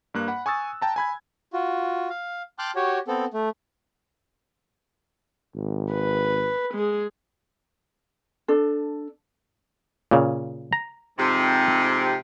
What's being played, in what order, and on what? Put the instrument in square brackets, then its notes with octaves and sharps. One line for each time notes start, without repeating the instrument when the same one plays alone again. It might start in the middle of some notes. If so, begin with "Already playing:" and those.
[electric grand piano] G2 A#3 F#6
F#5 B5
G#5 C#6 D#6 E6 A6
G5 A5 A#5
G#5 B5 G#6
[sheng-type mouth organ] F4 F#4
F5
G5 A5 C6 D6 F6 F#6
F#4 G4 C#5
B3 C4 A4
A3
[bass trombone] G#1
[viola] B4
G#3 G#4
[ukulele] D4 A4
[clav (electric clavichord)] A#2 C#3
A#5
[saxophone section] F2 G#2 C3